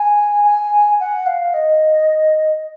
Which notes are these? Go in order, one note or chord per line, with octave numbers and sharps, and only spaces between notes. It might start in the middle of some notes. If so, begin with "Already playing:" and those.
Already playing: G#5
G#5
F#5
F5
D#5